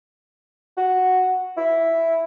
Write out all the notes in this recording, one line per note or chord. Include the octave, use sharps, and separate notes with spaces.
F#4
E4